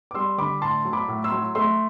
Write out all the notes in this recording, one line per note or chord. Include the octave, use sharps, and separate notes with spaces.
D6
G3 C6 E6
D3 B5 D6
A2 A5 C6
F#3
B5 D6
A2
C6 E6
F#3
A3 C6 E6